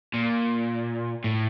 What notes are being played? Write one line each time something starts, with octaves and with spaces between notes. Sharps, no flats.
A#2
A2